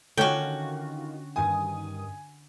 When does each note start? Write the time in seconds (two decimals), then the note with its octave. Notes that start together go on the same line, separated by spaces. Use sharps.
0.17 D3 D#3 C#4 D4 F4 F#4 G5
1.36 G2 D#3 G#5 D#6